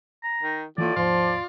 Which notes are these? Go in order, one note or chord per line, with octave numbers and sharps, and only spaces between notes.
A#5
D#3
A2 E3 G3 A#3 F4 D5
D#2 G#2 F3 F4